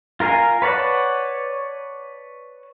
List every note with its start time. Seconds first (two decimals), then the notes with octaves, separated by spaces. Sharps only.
0.20 F4 A#4 F5 G#5
0.62 B4 C#5 D5 F#5 A5